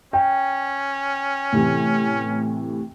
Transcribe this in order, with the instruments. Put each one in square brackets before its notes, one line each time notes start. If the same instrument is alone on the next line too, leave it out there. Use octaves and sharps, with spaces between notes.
[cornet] C#4 [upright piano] G5
[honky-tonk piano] A2 C3 E3